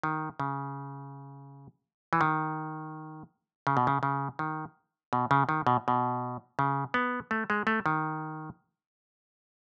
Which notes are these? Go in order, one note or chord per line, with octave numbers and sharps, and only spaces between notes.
D#3
C#3
E3
D#3
C#3
B2
C#3
C#3
D#3
B2
C#3
D#3
B2
B2
C#3
B3
A3
G#3
A3
D#3